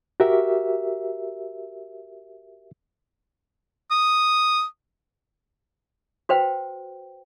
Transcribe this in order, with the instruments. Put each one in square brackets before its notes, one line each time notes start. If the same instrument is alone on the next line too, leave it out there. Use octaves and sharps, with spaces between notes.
[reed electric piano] F#4 G4 A#4 E5
[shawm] D#6
[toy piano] F#4 B4 C5 G5